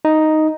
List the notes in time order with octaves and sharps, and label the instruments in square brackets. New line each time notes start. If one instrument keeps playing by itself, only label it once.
[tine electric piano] D#4